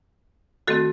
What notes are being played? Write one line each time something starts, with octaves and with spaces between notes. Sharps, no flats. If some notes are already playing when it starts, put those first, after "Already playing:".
D#3 A3 C4 F#4 A4